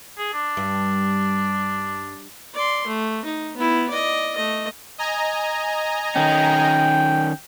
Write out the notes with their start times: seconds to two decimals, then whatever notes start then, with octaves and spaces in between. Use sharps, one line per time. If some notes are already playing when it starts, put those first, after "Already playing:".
0.18 G#4
0.33 D4
0.57 G2
2.55 D5 C6
2.87 A3
3.25 D#4
3.57 B3 E4
3.89 D5 D#5
4.35 A3 D#5
4.98 D#5 G#5 A#5
6.16 D#3 C#4 G5